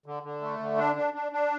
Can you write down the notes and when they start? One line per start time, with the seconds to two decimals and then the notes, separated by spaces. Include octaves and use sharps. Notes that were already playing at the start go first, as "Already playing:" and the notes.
0.06 D3
0.23 D3
0.41 A3
0.59 D3
0.78 D4
0.96 D4
1.14 D4
1.32 D4